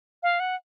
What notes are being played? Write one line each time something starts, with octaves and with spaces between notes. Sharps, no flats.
F5
F#5